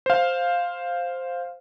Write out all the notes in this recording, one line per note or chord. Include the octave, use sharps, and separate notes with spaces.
C5 F5